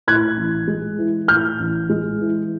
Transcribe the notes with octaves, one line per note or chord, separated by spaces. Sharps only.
A2 F#6 G#6
A1
G#3
E3
A2 F6 G6
A1
G#3
E3